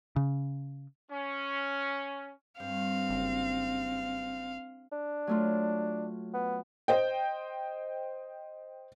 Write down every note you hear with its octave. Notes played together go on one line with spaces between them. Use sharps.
C#3
C#4
G2 C4 F5
F#1
D4
F#3 A3 F4
B3
C5 D#5 G5